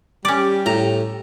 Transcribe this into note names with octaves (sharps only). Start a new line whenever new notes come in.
G3 C#4 G4 D5
A2 A#5